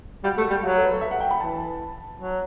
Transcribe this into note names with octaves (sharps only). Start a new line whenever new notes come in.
G3 F#4
A3
G3
F#3 F#4
A4
B4
A4
E5
F#5
G5
B5
E3 A5
F#3